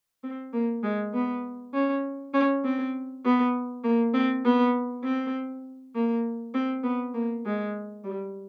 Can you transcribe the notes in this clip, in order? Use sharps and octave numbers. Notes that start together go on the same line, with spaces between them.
C4
A#3
G#3
B3
C#4
C#4
C4
B3
A#3
C4
B3
C4
A#3
C4
B3
A#3
G#3
G3